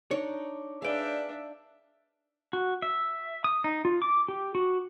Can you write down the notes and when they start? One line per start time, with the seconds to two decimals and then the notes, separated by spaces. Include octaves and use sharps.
0.11 D4 D#4 C#5
0.82 D4 G#4 B4 D5 E5 F5 G5
2.53 F#4
2.82 E5
3.44 D#6
3.64 D#4
3.85 F4
4.02 D6
4.28 G4
4.55 F#4